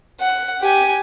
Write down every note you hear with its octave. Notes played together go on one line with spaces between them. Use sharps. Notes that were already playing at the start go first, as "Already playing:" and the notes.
F#5
G4 G#5